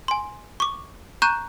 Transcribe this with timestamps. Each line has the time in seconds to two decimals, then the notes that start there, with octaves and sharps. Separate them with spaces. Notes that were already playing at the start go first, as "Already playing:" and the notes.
0.08 G#5 C6
0.60 C#6 D6
1.22 A#5 C#6 F#6 G6 D#7